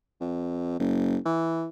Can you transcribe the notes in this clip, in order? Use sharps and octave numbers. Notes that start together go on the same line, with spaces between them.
F2
F#1
E3